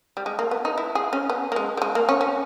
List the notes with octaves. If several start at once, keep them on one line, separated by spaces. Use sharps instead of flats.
G3
G#3
A#3
B3
D#4
E4
G#4
C#4
B3
A#3
G#3
G3
G#3
A#3
C#4
C#4